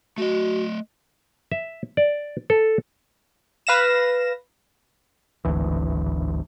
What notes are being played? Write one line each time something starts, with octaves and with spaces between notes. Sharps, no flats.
A3 F#4 D#5
E5
D5
A4
B4 F5 A#6 E7
D1 G#1 D2 E3